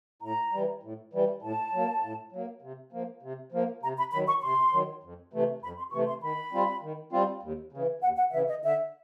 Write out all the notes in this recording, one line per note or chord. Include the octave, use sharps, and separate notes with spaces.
A2 A#5
E3 G3
A2
E3 G3
A2 A5
F#3 A#3
A2
F#3 A#3
C3
F3 A#3
C3
F3 A#3
C3 A#5
B5
D#3 F#3 B5
C#6
C3 C6
D#3 F#3
F2
C3 E3 A3
F2 B5
C6
C3 E3 A3 C#6
C6
D#3 B5
G3 C4 F4
D#3
G3 C4 F4
D#2
C#3 E3
D#2 F#5
F#5
C#3 E3 E5
D#5
D3 E5